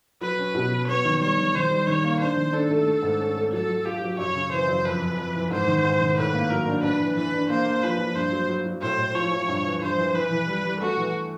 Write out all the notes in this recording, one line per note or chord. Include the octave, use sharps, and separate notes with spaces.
F#3 B4
C#4
B2
F#3
B3 C#5
D#3
G3 C#5
D#3
D#3 C5
G3
D#3 C#5
A#3
D4 C5
D#3
D4 A4
A3
A3
G#2
C#4
A3
F#3 A4
F#3
F4 G4
F#3
F#2 C#5
C#3
E3 C5
F#2
F2 B4
F2
F2
E3
G#2 C5
D#3
G#2
D#3
A2 B4
A#3
F#3 A#4
D4
D4 B4
E3
E3 B4
D4
A#3 C5
A#3
F3 B4
F3
G2 C5
F#3
F#3
F#3
A2 C5
A2
F3 C#5
F3
G2
E3
G2 C5
E3
E3 B4
E3
G3
G3
A3 F#4
E3